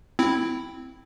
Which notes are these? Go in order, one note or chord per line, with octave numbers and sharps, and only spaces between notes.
C4 E4